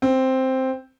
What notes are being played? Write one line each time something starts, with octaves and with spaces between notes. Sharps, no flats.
C4